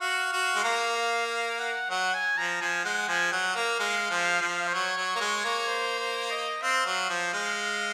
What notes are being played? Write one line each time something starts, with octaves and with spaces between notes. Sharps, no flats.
F#4 F5
F#4
G#3
A#3
F5
F5
F#5
F#3 F#5
G#5
F3 A#5
F3 G#5
G#3 F#5
F3 G#5
F#3 F#5
A#3 F5
G#3
F3
F3
C5
F#3 C#5
F#3
A#3
G#3
A#3
C5
C5
D#5
C4 F5
F#3
F3
G#3